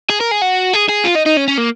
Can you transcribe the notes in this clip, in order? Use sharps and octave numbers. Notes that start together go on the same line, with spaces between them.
G#4
A#4
G#4
F#4
G#4
G#4
F4
D#4
D#4
C#4
C#4
A#3